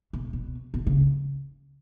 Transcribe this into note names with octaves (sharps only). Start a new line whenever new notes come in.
B2
B2
B2
C#3